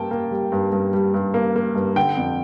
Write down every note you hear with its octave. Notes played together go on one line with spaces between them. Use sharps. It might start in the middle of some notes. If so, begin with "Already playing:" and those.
Already playing: G2 G3 A#3 G5 A5
A#3
G3
G2
G2
G3
G2
A#3
A#3
G2
D3 G5
F2